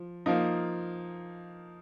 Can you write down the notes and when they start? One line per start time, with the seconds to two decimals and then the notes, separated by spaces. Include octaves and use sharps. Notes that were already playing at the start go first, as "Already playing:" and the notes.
Already playing: F3
0.26 F3 A#3 D#4